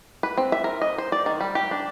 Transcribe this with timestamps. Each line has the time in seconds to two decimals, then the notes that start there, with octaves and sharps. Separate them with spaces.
0.23 B4
0.37 C4
0.52 E5
0.64 A#4
0.82 D#5
0.98 C5
1.12 D5
1.26 D#3
1.41 G3
1.55 G4
1.71 D4